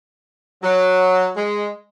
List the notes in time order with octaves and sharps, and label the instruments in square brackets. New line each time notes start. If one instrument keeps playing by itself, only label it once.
[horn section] F#3
G#3